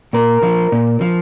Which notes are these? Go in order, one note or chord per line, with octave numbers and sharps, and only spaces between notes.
A#2 A#4
F3
A#2
F3